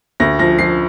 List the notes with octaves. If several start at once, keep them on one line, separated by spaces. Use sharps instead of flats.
D2 A#6
F3 A#6
F3 C7